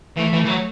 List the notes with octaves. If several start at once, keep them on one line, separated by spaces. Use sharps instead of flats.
E3 A3
E3
E3
F#3